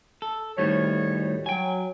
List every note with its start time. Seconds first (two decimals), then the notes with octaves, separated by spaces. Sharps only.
0.22 A4
0.58 D2 A2 D#3 G3 C#5
1.46 F#3 G5 G#5